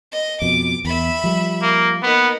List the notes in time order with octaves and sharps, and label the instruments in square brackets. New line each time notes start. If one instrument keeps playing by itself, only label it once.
[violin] D#5
[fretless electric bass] F2 B2 [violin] D6
[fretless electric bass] E2 [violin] E5 B5
[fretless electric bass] F3 G3
[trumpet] A#3
[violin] A#3 D#4 [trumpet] B3